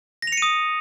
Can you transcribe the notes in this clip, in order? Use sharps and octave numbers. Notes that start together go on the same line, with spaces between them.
D#6 A#6 C#7 D#7 F7